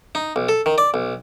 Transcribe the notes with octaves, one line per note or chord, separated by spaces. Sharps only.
D#4
B1
A4
D#3
D5
B1